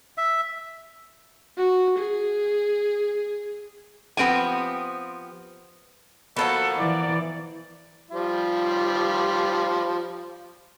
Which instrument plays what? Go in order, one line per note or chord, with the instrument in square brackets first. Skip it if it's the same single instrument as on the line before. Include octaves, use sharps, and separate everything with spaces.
[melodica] E5
[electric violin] F#4
G#4
[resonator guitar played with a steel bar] F3 B3 C4 G4 G#5
[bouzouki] F3 A#3 B3 [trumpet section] F#4 A4
[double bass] E3 [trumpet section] D5
[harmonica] F3 G3 F4